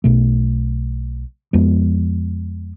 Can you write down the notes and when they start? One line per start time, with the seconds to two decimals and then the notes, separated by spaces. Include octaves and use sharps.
0.04 B1 B2 A3
1.53 F2 F3 G#3 B3